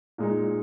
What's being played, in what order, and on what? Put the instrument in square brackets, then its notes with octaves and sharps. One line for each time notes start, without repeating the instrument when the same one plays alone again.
[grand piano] A#2 G#3 D#4